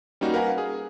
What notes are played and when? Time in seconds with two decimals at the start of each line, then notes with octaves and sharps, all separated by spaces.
0.21 G3 A#3 C#4 D#4 F#4
0.34 A#4 B4 F5 F#5 G#5
0.58 G#4